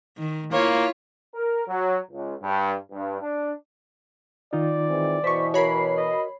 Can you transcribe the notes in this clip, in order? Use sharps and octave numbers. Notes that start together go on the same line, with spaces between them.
D#3
A#3 E4 F4 C#5
A#4
F#3
C#2
G2
G2
D4
D#3 D#4 F4 D5
E3 G#3 C4
B2 E3 C5 C#6 B6
F#4 A#4 C#5 B5 C7
D#5